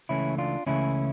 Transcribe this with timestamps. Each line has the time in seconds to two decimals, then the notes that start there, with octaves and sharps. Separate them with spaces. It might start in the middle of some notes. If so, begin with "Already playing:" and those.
0.09 C#2 C#3 E3 A3 C#4 E4
0.38 D4 F4
0.66 C#2 C#3 E3 A3 C#4 E4